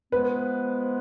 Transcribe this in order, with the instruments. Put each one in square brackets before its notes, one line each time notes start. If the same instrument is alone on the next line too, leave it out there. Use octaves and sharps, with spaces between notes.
[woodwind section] F3 G#3 B3 [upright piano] B4